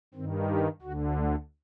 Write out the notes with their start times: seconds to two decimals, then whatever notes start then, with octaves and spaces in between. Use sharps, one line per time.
0.14 G2 D#3 C4
0.49 G4
0.82 D2 D3 F#4
1.15 A3